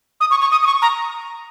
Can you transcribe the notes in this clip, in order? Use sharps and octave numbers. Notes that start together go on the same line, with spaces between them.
D#6
C#6
C#6
D#6
D#6
C#6
A#5